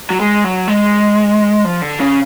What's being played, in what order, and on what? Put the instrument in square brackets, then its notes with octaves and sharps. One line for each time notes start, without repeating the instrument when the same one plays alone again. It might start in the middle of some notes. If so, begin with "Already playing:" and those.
[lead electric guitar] F#3
G#3
F#3
G#3
F3
D3
C#3